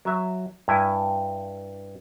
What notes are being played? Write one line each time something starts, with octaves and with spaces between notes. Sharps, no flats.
F#3 E5
G2 E4 G#5